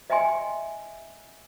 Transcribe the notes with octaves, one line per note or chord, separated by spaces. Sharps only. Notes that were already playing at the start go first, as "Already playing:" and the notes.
D#5 E5 G5 G#5 C6